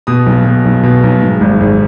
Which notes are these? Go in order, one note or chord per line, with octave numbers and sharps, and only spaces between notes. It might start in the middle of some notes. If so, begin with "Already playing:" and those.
B2 D#6
B1
B2
B1
B2
B1
G#2
G#1
G#1